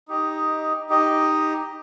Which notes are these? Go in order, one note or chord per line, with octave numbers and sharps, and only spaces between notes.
D#4 G4 D#5
D#4 G4 D#5